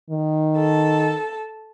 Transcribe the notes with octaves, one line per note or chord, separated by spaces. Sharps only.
D#3
A4 A5